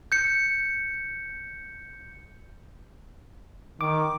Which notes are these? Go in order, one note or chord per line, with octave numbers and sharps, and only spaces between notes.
G6 C#7
D#3 D6